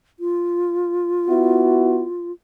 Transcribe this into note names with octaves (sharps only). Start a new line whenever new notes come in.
F4
B3 E4 F#4